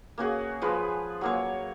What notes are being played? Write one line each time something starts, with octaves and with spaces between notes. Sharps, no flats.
A#3 C#4 F#4 G#4
F3 G#3 B4
F#3 A#3 C#5